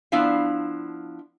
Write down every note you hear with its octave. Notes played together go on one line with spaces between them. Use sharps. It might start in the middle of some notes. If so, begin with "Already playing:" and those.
F3 B3 D4 E4 E5 F5